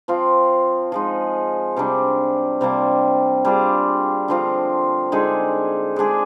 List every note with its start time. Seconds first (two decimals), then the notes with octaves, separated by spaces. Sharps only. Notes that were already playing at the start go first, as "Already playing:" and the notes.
0.08 F3 C4 F4
0.92 F3 G#3 D#4
1.76 C3 G3 D4
2.61 C3 G3 A#3 D4
3.45 G3 D4 F4 G#4
4.28 D3 F3 C4 F4
5.12 D3 G#3 D#4 G#4
5.96 G#3 D4 G#4